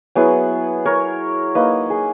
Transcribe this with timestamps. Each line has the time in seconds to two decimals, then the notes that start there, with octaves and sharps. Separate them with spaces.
0.15 F#3 B3 E4 G#4 B4
0.85 A#4 C#5
1.55 A#3 D#4 B4 D#5
1.90 G#4